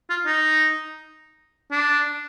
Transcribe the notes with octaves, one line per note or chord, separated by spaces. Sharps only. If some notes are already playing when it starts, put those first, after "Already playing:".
F4
D#4
D4